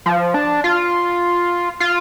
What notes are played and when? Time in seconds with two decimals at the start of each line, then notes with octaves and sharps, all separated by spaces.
0.06 F3
0.34 D4
0.64 F4
1.80 F4